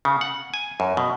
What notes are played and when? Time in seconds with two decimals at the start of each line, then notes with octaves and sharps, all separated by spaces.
0.05 C#3
0.21 F#5
0.54 G#5
0.80 F#2
0.97 B2